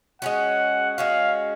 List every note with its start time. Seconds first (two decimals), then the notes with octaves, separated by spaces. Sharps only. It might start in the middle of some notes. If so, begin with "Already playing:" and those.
0.22 G#3 C#4 F#4 F#5
0.97 G#3 C#4 F#4 F5